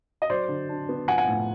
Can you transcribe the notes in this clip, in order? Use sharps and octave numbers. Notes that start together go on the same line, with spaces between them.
D#5
F#3 C5 D5
D3
D4
B3
F3 F#5 G#5
F#5 G#5
A2